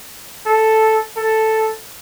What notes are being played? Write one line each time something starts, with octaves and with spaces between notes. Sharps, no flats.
A4
A4